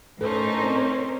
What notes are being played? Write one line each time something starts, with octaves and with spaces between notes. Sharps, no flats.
A2 C#4 D#4 A4 A#4 C5
C4 D5